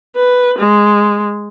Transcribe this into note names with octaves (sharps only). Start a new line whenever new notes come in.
B4
G#3